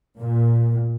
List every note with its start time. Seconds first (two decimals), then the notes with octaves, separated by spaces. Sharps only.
0.20 A#2